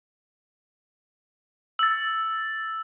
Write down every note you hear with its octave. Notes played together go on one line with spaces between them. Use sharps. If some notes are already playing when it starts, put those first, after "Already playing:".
E6 A6